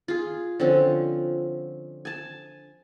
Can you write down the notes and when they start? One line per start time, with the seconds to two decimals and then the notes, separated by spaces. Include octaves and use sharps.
0.08 F4 G#4
0.60 D3 F3 C4 C#4
2.05 G#5 A5